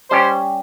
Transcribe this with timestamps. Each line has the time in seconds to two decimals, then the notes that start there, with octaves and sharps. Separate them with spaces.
0.10 G3 C#4 G4 C5